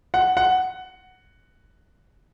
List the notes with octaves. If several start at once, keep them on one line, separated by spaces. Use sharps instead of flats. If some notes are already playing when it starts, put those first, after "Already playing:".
F#5
F#5